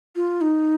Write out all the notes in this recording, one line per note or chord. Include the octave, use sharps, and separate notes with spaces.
F4
D#4